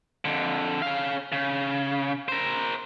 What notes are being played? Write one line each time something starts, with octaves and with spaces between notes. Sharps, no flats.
F2 D3
C#4 F5
C#3
A#4 C5